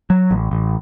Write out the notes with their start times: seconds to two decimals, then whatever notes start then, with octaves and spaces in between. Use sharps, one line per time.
0.10 F#3
0.31 A1
0.51 A1